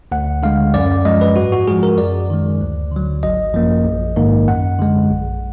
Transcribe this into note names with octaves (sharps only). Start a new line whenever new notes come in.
D2 F#5
D3 G#3 F5
F#2 D5
F3 G#3 D#5
B4
G#2 F#4
F#4
F3 G#3 G#4
A#4
F#2 D5
D#3 G#3
D2
D3 F#3
G#1 D#5
F#2 F3 A#3
A#1
G#2 D#3 A#3
F#2 F#5
D3 G#3
A#1